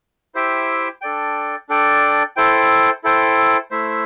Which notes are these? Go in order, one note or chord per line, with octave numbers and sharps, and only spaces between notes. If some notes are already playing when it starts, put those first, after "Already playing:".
E4 G4 C5 E5 G5
D4 A4 D5 G5
D4 A4 D5 G5
E4 A4 C5 G5
E4 A4 C5 G5
A3 E4 C5 E5